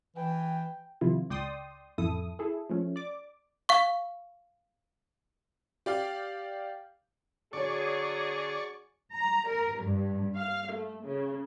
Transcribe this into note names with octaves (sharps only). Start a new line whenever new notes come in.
E3 G5
C3 D#3 F3 E4 F4
C#2 D5 G5 C6 D#6
A1 F2 E4 A4 D#6
E4 G#4 A4
F3 A3 C#4
D5 D6
F5 C#6
G4 D5 F5
D3 F#3 G#4 C#5 D5 C#6
A#5
A#4
G2
F5
A3
C#3